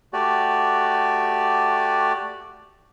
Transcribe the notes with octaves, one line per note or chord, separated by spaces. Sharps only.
A3 F#4 G4 D5